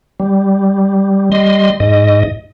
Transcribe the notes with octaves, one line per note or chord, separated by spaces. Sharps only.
G3
G3 D#5 C6
G#2 D#5